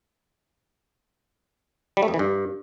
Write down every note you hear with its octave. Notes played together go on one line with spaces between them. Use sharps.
G3
A3
F2
E3
G2